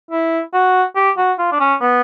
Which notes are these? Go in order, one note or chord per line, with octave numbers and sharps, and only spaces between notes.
E4
F#4
G4
F#4
F4
D4
C#4
B3